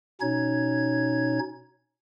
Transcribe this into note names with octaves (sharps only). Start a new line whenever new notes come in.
B2 C#4 D#4 C#5 G#6